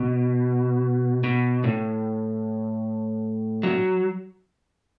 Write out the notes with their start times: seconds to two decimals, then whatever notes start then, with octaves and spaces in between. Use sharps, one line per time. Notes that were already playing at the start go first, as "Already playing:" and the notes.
Already playing: B2
1.24 B2
1.64 A2
3.63 F#3